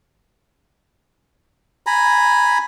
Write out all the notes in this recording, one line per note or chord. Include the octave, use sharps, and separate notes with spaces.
G#5 A#5 B5